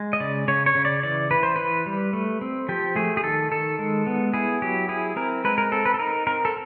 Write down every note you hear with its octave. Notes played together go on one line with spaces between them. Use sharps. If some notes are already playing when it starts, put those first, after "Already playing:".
Already playing: G#3
D#5
C#3 D5
C#3 C#5
C#5
C#3
D5
E3 D5
E3 B4
C5
E3 B4
G3
A3
C4
F3 G4
A3 G#4
G#4
D#3 A4
D#3 A4
G#3
B3
E4 G#4
F#3 G4
E4 G#4
C4 A#4
G#3 B4
A#4
C4 A4
B4
A4
D#4 A#4
C4 A#4
A4